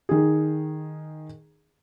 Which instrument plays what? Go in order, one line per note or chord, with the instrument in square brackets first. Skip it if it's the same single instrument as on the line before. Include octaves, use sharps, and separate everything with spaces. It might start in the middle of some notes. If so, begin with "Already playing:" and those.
[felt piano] D#3 G#4